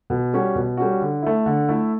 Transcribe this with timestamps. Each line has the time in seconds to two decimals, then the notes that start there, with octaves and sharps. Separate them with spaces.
0.10 B2
0.33 G3 C#4 F#4
0.56 B2
0.77 G3 C#4 F#4
1.01 D3
1.22 A3 E4
1.46 D3
1.69 A3 E4